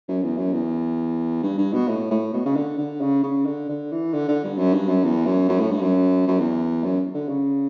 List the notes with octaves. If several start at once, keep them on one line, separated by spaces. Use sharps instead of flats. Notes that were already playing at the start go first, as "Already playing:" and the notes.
F#2
E2
F#2
E2
G2
G2
B2
A2
A2
B2
C#3
D3
D3
C#3
C#3
D3
D3
E3
D3
D3
G2
F#2
G2
F#2
E2
F#2
F#2
A2
G2
F#2
F#2
E2
F#2
D3
C#3